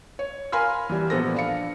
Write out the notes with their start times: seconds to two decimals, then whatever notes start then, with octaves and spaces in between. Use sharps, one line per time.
0.19 C#5
0.52 A#4 F5 G#5 B5 C6 F6
0.90 E3 G3
1.10 A#1 B3 A4 C5 A#6
1.34 D4 F5 C#7